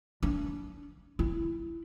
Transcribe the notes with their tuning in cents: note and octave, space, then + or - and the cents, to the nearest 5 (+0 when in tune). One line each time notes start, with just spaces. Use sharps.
D4 -35
E4 +20